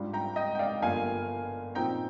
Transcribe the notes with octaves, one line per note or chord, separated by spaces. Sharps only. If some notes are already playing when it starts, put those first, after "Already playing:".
Already playing: G#2 G3 D4 F4
G5 A#5
D#5 G5
G5
D5 F5
G1 G2 F3 A#3 F5 G#5
A#2 F3 C4 D#4 G5 A#5